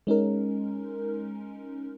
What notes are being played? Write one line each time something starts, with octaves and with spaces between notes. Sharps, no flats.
G#3 C#4 D#4 A#4